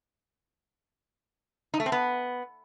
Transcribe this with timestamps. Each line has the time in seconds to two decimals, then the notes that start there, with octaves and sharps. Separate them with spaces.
1.74 D#4
1.80 A3
1.86 C4
1.92 B3